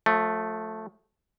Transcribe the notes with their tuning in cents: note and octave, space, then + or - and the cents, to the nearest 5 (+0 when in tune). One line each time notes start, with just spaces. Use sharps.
F3 +35 A3 +0